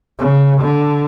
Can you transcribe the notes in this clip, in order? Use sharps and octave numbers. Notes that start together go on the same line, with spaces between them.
C#3
D3